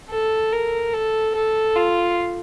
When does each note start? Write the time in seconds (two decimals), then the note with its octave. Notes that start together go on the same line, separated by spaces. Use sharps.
0.10 A4
0.52 A#4
0.94 A4
1.35 A4
1.76 F4